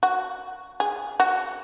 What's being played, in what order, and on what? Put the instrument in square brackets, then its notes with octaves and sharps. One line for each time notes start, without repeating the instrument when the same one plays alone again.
[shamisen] F#4
G#4
F#4